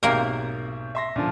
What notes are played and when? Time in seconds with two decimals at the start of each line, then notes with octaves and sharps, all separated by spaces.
0.03 B1 G#2 C3 A#3 A#4
0.95 E5 C6 A#6
1.16 A#2 D3 F3